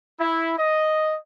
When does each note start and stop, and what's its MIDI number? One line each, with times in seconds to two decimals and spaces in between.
0.20 0.54 64
0.57 1.15 75